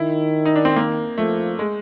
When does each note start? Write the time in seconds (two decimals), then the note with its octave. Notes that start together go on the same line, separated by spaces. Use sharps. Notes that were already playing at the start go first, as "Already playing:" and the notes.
Already playing: D#3 E4
0.45 D#4
0.56 D4
0.65 C4
0.76 A#3
1.18 F3 A3
1.59 G#3